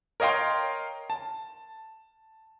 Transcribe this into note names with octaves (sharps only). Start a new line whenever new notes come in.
A#4 C#5 D#5 F5 G5 C6
A5